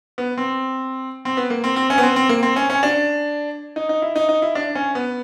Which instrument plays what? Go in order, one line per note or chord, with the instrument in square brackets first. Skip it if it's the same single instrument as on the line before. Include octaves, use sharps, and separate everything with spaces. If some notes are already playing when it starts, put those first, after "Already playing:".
[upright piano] B3
C4
C4
B3
A#3
C4
C4
C#4
B3
C4
C4
A#3
C4
C#4
C#4
D4
D#4
D#4
E4
D#4
D#4
E4
D4
C#4
B3